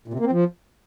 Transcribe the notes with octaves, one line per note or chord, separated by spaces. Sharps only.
A#2
C3
A#3
C4
F3